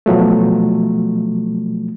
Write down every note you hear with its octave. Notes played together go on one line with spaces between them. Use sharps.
B2 F3 F#3 A3